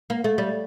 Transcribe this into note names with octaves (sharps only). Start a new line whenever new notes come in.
A#3
A3
G3